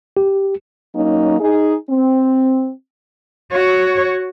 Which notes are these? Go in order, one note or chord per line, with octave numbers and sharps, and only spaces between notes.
G4
F#3 A#3 C#4 D#4
D#4 G#4
C4
F#4 C#5